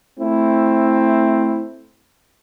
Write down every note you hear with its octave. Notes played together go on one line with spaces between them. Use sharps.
A3 C4 E4